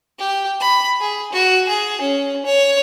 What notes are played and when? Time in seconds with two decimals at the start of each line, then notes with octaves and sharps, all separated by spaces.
0.19 G4
0.60 B5
1.01 G#4
1.32 F#4
1.69 G#4
2.01 C#4
2.46 C#5